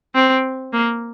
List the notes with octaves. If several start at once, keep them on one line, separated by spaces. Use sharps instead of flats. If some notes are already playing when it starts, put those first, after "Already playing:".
C4
A#3